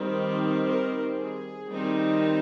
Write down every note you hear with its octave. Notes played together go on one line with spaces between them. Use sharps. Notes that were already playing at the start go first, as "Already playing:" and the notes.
Already playing: D#3 G3 C4
A#4
G#4
D#3 G3 C4 D#4